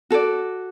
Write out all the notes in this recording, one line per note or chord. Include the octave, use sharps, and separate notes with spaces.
F#4 A4 D5